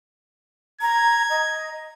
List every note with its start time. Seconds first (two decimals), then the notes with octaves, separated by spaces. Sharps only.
0.81 A#5 G#6
1.30 D#5